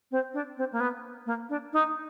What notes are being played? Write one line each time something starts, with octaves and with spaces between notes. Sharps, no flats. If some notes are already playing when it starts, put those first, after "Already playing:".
C4
D4
C4
A#3
B3
A#3
D4
D#4